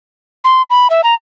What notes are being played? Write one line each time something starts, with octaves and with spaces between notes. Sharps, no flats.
C6
B5
E5
A#5